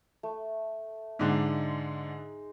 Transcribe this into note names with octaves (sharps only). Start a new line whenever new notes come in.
A3
G#2 D3 G#3 D#4 D6